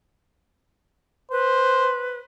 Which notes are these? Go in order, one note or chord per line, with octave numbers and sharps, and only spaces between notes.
B4 C5